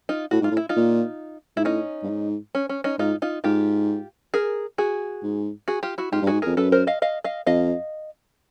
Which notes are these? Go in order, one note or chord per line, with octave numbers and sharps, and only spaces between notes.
D#4 F4
A2 F#4
G#2 F4
A2
E4
D#4 F4
A#2
G#2 E4
A2 C#4 D#4
G2
G#2
C#4
C#4
C#4 D#4
G#2 D#4 F4
D#4 F4
G#2 F4 G4
G#4 A#4
F#4 G#4
G#2
F#4 G#4
F4 G4
E4 F#4
G#2 F4 G4
G2
G#2 F#4 G#4
F2 G#4 A#4
F#2 A4 B4
A#4 C5
D#5 F5
D#5 F5
D#5 F5
F2 D#5 F5